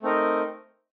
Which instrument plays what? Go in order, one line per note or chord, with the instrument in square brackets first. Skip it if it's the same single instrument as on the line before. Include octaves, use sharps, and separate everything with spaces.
[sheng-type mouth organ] A3 C4 D#4 A#4 D#5